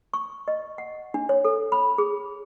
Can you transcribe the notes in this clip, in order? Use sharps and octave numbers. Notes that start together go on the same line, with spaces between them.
C#6
D#5
F#5
D4
C#5
A4
B5
G#4